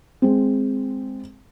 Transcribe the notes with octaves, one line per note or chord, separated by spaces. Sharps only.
G#3 C4